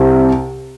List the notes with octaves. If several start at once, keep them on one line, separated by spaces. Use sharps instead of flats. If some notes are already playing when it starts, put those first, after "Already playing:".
Already playing: C2 C3